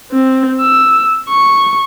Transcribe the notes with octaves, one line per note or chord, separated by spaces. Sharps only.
C4
E6
C#6